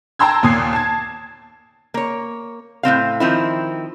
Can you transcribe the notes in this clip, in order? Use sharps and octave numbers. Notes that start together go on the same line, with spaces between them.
G5 A5 A#5 C6 E6 G#6
D#2 A#2 D#6 G#6 C7
A5 G#6
A#3 C#5
A2 G#3 C4 F5
D#3 F3 C4 E4